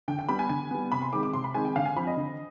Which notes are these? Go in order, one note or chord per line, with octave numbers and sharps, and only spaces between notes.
D3 G5
G5
G3 B3 B5
G#5
D3 G#5
G3 B3
C3 B5
C6
D#3 G#3 C4 D6
D6
C3 C6
B5
D#3 G#3 C4 G#5
G5
D3 F5
G#5
F3 C4 B5
D#5
D3